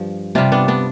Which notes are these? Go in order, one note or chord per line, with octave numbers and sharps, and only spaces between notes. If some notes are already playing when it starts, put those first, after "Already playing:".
Already playing: G2 F3
C3 G3 D4 F4
B3 D4
B3 D4